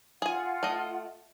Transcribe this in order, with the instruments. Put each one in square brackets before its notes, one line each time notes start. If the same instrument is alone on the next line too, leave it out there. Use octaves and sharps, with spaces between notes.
[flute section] F4 F#5 [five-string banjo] G#4 G#5
[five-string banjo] A3 D#5